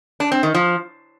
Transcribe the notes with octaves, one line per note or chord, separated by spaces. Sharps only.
D4
C4
D#3
F3